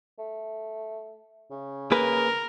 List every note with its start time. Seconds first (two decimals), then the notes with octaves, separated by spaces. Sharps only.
0.19 A3
1.50 C#3
1.92 A#3 G#4 A#4 B4